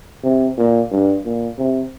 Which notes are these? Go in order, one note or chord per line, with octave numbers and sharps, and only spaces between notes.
C3
A#2
G2
A#2
C3